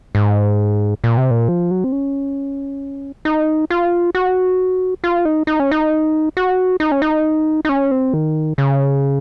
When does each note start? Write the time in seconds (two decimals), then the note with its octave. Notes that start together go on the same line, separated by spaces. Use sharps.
0.15 G#2
1.04 A#2
1.17 C3
1.31 A#2
1.49 F3
1.71 F#3
1.84 C4
1.92 C#4
3.25 D#4
3.70 F4
4.15 F#4
5.04 F4
5.25 D#4
5.47 D#4
5.60 C#4
5.71 D#4
6.37 F#4
6.80 D#4
6.92 C#4
7.02 D#4
7.65 D#4
7.69 C#4
7.91 C4
8.14 D#3
8.58 C#3